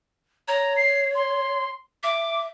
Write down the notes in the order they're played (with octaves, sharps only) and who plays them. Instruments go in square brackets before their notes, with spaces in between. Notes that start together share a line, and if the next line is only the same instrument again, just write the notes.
[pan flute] C#5 [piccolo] A#5
[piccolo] C7
C6
[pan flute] E5 [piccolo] D6